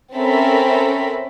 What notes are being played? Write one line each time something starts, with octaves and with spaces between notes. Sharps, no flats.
C4 C#4 A4 A#4 E5 B5